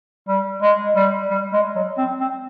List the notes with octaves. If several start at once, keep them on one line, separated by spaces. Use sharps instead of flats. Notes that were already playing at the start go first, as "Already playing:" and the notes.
G3
G#3
G3
G3
G#3
F#3
C4
C4